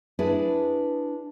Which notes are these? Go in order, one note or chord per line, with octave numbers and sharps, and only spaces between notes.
D4 E4 G#4 B4